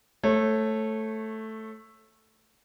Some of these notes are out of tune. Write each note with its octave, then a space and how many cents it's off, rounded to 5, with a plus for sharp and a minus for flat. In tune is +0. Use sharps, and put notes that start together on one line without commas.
A3 +0 C#5 -25